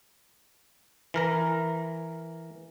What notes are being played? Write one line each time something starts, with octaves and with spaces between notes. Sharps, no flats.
E3 A#4 A#5